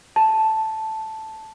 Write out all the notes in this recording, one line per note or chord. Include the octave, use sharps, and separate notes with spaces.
A5